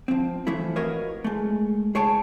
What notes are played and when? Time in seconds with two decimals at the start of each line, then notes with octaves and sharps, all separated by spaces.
0.08 F3 C4
0.47 E3 F3 A3 E4
0.76 F#4 A#4 B4 C#5 D#5 F5
1.24 G#3 A3
1.95 G#4 C#5 G5 A5